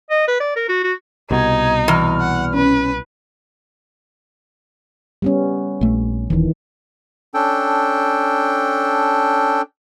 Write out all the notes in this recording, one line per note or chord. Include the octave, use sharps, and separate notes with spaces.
D#5
B4
D5
A#4
F#4
F#4
C2 B2 D#4 G#6
E2 F6
F#5
C#4 B4
G3 B3 C#4
A#1 A3
D#1 D#3 E3
C#4 D4 A4 G5